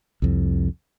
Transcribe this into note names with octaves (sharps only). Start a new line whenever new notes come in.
C2 F2